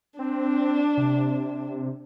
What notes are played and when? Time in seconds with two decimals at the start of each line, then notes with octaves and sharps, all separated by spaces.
0.19 C4 D4
0.97 C3